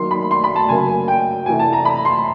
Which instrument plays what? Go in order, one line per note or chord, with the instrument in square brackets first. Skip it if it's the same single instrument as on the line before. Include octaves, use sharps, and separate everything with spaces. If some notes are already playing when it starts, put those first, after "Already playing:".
Already playing: [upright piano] D#3 F#3 A#3 C6
B5
C6
B5
A5
C#3 F#3 A#3 G#5
G#5
G5
C3 E3 A3 G#5
A5
A#5
B5
C6